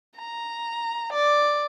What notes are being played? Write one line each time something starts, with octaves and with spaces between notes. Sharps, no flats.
A#5
D5